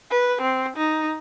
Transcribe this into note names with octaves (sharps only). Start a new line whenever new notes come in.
B4
C4
D#4